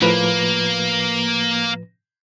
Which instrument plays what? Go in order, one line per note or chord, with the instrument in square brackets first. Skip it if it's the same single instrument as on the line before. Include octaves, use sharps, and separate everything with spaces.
[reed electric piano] A2 F3 B4 [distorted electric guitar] A#3